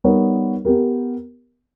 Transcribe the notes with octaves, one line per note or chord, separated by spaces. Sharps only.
G3 B3 D#4 A#4 C#5
B3 G4 A#4